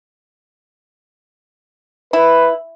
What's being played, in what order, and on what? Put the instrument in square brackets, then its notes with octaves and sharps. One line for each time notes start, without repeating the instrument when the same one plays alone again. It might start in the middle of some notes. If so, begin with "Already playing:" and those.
[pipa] E4 [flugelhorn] B4